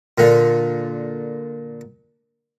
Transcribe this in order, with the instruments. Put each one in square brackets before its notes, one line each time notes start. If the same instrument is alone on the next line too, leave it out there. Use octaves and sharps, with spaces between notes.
[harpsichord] A#2 D3